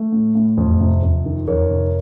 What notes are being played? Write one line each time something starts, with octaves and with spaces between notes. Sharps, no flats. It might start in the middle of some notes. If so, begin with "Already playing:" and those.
Already playing: A3
A2
A2
F2
C3
F2
D#3
F2 A#4 C#5
C3